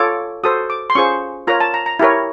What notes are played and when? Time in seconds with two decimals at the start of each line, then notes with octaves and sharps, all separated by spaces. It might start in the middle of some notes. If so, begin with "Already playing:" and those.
Already playing: F4 A4 C#5 D6
0.44 F#4 A4 C5 D#6
0.70 D6
0.90 C6
0.95 C#4 F4 G#4 C5 C#6
1.47 F4 A#4 C#5 A#5
1.60 A5
1.74 A#5
1.86 A#5
1.99 E4 G4 A#4 C#5